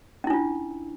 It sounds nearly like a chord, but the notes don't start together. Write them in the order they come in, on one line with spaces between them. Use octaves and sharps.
C#4 E4 D4 F4